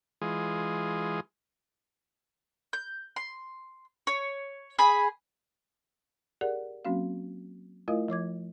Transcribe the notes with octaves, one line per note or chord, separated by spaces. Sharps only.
E3 G#3 F4 G#4
G6
C6
C#5
G#4 G#5 B5
G4 G#4 A#4 D5 F#5
F#3 A#3 C4 C#4 F#4 F5
A3 E4 F4 A#4 D#5 F5
F3 C#5 D6 G#6